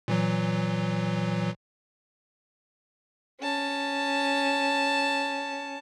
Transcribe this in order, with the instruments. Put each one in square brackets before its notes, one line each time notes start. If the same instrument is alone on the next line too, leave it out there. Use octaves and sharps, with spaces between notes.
[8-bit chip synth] A#2 E3 F#3
[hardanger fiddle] C#4 A5